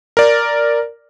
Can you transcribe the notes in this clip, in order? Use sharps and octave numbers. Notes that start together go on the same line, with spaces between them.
A#4 D5